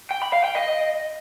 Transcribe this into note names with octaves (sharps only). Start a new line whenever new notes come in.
G5
B5
F5
G5
D#5